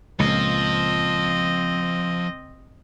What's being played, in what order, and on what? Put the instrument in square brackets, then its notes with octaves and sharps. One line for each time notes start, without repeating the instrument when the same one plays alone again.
[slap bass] C#2 A#2 [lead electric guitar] F3 [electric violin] C4 D#5